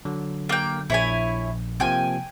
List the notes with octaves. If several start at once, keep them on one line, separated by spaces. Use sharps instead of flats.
D3 F#3
A#3 G5
A#1 E4 C#5 G#5
C3 F3 A#3 G5 G#5